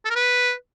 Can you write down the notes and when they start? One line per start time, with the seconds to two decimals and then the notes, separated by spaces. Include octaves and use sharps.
0.05 A4
0.10 A#4
0.15 B4